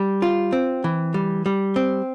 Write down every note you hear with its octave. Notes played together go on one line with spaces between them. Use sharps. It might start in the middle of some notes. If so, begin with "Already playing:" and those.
Already playing: G3
F4
C4
E3
G3
G3
C4